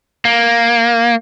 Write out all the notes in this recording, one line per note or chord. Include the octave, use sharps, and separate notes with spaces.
A#3